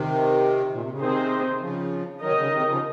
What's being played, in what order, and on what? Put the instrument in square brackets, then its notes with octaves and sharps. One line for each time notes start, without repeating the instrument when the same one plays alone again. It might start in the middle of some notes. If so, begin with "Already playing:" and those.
Already playing: [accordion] C3 D#3
A#2
C3
C#3
[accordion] C3 D#3 [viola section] C4 D#4 G#4 C5
[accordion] C#3 F3
[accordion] D#3 F#3 [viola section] D#4 A#4 D#5
[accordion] C3
C#3
C3 D#3
C#3 F3